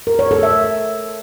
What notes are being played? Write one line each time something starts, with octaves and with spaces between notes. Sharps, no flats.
A#4
C#5
A4
E5